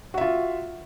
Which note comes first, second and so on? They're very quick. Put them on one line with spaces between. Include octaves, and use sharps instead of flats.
F#4 E5 F4